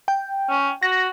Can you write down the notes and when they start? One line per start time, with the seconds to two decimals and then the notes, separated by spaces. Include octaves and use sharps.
0.08 G5
0.50 C#4
0.83 F#4 A#6